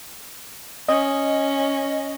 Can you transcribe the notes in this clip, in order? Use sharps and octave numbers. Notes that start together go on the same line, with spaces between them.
C#4 D#5